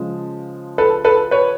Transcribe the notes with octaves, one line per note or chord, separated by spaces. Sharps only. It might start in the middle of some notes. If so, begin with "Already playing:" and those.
Already playing: C#3 F3 G#3
A4 B4
A4 B4
B4 C#5